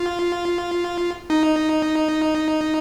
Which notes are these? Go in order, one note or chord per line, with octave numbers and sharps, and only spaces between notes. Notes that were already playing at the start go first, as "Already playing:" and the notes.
Already playing: F4
D#4